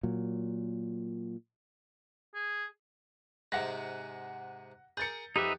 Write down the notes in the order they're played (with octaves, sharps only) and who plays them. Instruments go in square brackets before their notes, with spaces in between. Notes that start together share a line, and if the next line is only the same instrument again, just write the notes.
[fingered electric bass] A#2 F#3
[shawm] G#4
[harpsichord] G#2 C3 G#3 [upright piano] F#5 A#6
[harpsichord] G#4 A#4 [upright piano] G6 A6 C#7
[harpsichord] F2 [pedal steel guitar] D#4 B4 E5 [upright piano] G4